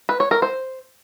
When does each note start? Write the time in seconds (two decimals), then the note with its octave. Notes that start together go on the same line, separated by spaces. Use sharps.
0.09 B4
0.20 C#5
0.31 A#4
0.42 C5